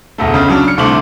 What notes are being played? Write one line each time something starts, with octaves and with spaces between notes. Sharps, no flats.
E1 D2 A3
C#2 C#3
C#3 F#3 D4
F6 C#7
C2 D3 A3 C4 D6 F#7